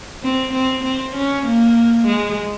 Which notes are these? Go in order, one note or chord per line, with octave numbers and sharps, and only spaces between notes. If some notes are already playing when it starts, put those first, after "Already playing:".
C4
C4
C4
C#4
A#3
G#3